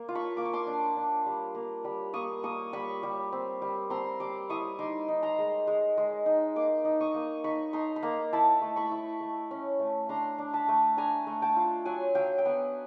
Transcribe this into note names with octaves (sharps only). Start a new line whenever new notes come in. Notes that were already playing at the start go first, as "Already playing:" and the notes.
Already playing: A#3
F4
B5 C#6
A#3 D6
C#6
C6 D6
D4
D4
G3
A#3
G3
A#3 C#6 D#6
A#3 C#6 D#6
G3 B5 C#6
G3
C4
G3
C4 A#5 C6
G3 C6 D6
E4 C#6 D#6
D#4 C6 D6
D#4
A#5 C6
G#3
G#3
G#3
D#4
A#3 C6 D6
D#4
C#6 D#6
A#3
D#4 B5 C#6
D#4 A#5 C6
B5
A#3 A#5 C6
E4 A5 B5
A3
B5 C#6
E4
A3
C#4
A3
D4 A#5 C6
D4
A5 B5
A3
D4 G#5 A#5
A3
G5 A5
F4
F#3 F#5 G#5
F#3 F5 G5
G5
B3 F#5 G#5